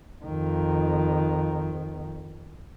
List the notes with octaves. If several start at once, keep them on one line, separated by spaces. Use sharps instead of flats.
F2 D#3